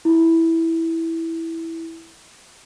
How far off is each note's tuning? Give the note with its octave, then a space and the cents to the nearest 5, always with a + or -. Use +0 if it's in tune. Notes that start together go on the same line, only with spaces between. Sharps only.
E4 -5